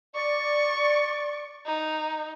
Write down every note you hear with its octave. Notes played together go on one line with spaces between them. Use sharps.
D5 C#6
D#4